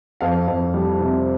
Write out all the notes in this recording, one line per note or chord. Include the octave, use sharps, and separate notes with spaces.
F2 F5
F2
G3
C3